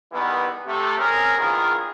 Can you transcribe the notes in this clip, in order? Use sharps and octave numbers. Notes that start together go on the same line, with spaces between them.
D#3 E3 G3 G#3 B3
C3 A3
C4 C#4 G#4 A#4
A#1 E2 D#3 F4 G#4 A#4